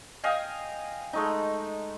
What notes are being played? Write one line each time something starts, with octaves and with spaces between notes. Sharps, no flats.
D#5 F5 G5 G#5
G#3 A3 D#4